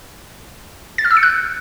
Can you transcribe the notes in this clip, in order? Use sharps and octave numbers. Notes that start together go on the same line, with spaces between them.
A6
F6
E6
C#7
F#6